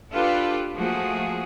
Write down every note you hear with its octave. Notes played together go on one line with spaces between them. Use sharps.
D4 F4 G4 A4 B4
F3 A3 A#3 F#4 G#4